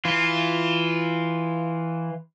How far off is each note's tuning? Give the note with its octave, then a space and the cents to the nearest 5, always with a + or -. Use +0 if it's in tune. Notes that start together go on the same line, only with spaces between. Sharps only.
E3 +0 F4 +0